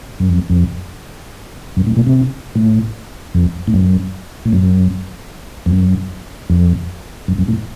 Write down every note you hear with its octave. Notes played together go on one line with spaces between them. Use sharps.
F#2
F2
F2
F#2
A2
A#2
C3
A2
F2
A2
F#2
A2
F#2
F2
F#2
F2
F#2
F#2
A2